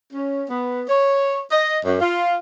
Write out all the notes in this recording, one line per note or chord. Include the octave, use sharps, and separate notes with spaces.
C#4
B3
C#5
D#5
F#2
F4